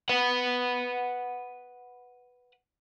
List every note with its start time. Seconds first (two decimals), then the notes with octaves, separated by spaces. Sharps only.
0.09 B4 F#5